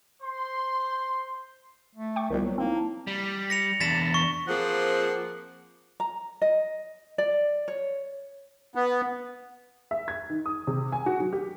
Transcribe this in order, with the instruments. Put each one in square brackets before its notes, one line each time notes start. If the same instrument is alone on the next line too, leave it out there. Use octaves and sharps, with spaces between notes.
[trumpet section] C5 C6
[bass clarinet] A3
[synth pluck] G5 C#6 D6
[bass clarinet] C2 [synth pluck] D#3 F3 G3 [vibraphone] B3 F4
[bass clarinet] F#3 [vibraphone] A#3
[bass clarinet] A#3 [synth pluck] C4 [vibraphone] D#4 E4 F5
[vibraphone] A5
[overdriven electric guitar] G3
[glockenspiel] A#6 C#7 F7
[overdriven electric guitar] E2 D4 [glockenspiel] A6 B6 E7
[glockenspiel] C#6
[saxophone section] F3 A#3 C4 G#4 F#5
[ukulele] A#5
D#5
D5
C#5
[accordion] B3
[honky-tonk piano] E5
G#6
D#3
D#6
C3
G#5
F#4
F#3
G4